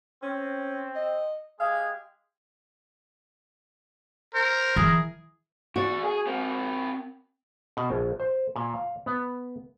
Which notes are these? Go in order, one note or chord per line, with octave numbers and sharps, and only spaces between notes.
C4 C#4
D#5
G#3 G4 G#4 F5
A#4 C5
E3 G#4
E2 F#4 D5
G#4 G#5
C4 A#4
B2
A#1
C5
A#2
F5
B3